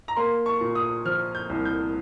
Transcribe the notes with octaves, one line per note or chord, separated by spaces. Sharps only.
A#5
A#3 C6
C#6
A#2
D#6
F3 F6
G6
C2
G6